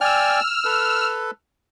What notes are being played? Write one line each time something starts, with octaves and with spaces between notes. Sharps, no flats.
D5 G5 G#5 E6 F6
A4 B4